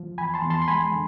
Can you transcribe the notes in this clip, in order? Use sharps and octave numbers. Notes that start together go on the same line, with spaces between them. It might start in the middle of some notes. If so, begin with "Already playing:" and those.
Already playing: F3
E2 G#5 B5
A5 C6
E2
A5 C6
C6
G#3 G#5 B5
D3